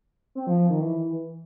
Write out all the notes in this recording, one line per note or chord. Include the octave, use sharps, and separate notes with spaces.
C4
F3
F3
D#3
E3